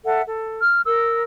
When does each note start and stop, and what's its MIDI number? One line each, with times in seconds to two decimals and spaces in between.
0.05 0.21 69
0.05 0.21 76
0.05 0.21 78
0.27 0.59 69
0.62 0.81 89
0.86 1.22 70
0.86 1.22 88